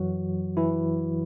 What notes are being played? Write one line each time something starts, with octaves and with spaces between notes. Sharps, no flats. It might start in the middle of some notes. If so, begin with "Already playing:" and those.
Already playing: F#2 E3 F#3 F#4
E3 E4